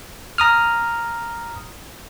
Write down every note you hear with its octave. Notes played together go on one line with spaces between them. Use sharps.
A#5 D#6 F6